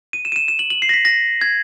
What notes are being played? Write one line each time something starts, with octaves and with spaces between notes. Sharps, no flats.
D#7
E7
D#7
E7
E7
F#7
F#7
C7
A#6
B6
A#6
G#6